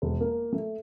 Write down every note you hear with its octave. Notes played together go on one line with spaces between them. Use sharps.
E1
A#3
A3